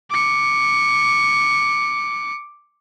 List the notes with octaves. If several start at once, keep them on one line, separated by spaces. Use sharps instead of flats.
D6 C#7